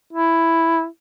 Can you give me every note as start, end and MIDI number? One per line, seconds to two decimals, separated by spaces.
0.13 0.86 64